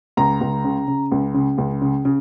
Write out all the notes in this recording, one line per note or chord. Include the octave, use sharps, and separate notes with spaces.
C#2 A#5
C#2
C#3
C#3
C#2
C#3
C#2
C#3
C#3